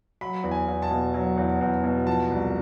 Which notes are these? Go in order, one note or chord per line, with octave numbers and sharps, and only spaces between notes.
F#3 B5
E2
G#5
E2
A5
B2
F#3
E2
E2
B2
F3 A5
C2